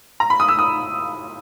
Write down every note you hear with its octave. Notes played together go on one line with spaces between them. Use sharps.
A#5
B5
D#6
E6
D#6